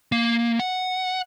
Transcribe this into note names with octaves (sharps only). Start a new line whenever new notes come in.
A#3
F#5